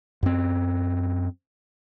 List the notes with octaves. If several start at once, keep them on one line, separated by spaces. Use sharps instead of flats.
F#2 C4